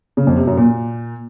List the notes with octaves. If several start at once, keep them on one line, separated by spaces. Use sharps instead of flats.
C#3
F2
C3
F#2
A#2